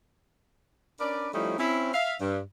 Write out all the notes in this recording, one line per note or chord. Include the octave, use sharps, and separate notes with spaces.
C#4 D4 A#4 B4 D5
F3 G3 A3 C#4 D#4 E4
C4 C#4 E4
E5 F5
G2